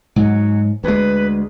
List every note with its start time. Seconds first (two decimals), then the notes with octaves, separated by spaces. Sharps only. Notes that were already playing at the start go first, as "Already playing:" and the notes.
0.16 G#2 F#3
0.84 D2 G#3 B4